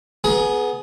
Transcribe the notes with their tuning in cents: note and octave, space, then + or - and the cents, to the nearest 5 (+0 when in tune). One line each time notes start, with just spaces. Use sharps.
B3 +0 G#4 +20 A#5 +30